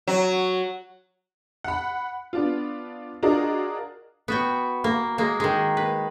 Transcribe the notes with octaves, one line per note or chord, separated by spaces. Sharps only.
F#3
F#5 B5
B3 D4 F4
D4 F4 F#4 G#4 A#4 D#5
B3 F#4 G5
A#3
G#3 A#3
D#3 G#3
B4